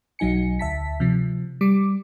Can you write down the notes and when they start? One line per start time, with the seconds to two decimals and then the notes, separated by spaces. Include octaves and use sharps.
0.19 B1 F#3 D#4 G#5 C#7
0.59 D2 E5 A5 B6
1.00 C3 F3
1.61 G3 D6